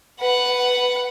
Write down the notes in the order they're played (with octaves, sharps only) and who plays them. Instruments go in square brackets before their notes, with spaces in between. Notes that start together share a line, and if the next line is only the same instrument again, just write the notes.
[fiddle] B4 F#5